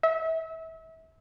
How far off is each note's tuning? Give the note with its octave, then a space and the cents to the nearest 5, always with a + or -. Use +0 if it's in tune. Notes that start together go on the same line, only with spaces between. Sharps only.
E5 -30